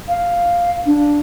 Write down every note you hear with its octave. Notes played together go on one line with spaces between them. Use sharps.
F5
D4